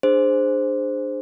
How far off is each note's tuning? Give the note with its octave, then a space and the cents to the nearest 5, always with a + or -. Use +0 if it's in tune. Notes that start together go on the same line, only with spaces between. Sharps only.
D4 +15 G#4 +0 C5 +0